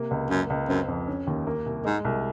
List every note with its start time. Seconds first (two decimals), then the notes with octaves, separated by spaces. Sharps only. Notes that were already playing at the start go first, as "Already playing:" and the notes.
Already playing: C3 A#3
0.11 C#2
0.30 F#2 A#3
0.50 C#2
0.69 F#2 C4
0.88 F2
1.07 C#4
1.27 D#2
1.47 A#3
1.66 C2
1.85 G#2 G#3
2.05 C2